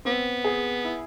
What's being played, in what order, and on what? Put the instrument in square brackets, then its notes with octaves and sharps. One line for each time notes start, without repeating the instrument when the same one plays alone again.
[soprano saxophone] B3 [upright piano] C4
[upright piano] G#4
E4